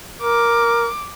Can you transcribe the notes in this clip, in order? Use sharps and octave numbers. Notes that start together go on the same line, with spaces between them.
A#4 D6